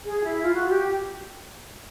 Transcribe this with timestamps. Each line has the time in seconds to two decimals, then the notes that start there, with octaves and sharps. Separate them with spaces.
0.06 G#4
0.24 E4
0.42 F4
0.55 F#4
0.69 G4